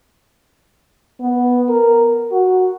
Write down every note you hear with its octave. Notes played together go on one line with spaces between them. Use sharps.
B3
A#4
F#4